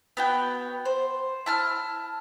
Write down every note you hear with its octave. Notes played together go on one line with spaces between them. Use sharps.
B3 F#4 G5
C5
E4 A5 F6